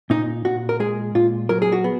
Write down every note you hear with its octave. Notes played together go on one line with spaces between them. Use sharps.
A#2 D#4
A#2 F#4
A#4
G#3 G#4
A#2 F4
F#3 A#4
G#4
F#4
B3